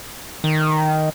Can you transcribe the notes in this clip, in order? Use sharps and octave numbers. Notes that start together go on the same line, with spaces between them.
D#3